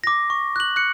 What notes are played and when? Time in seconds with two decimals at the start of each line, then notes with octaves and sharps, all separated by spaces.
0.04 D6 A#6
0.30 C#6
0.56 F#6 F#7
0.76 F#6 C#7